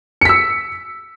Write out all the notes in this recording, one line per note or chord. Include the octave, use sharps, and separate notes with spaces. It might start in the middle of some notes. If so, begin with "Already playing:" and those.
E6 B6 C#7